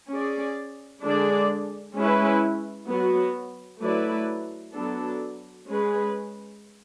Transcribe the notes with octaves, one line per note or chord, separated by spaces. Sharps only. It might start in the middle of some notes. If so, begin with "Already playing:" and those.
C#4 G#4 D5
D3 G#3 D4 G#4 D5
G#3 C#4 E4 B4
F#3 B3 F#4
F#3 A3 E4 B4 D5
F#3 B3 D4 A4
G#3 C#4 G#4 B4